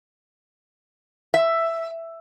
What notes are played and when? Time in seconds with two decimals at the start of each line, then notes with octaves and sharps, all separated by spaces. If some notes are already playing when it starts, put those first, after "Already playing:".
1.34 E5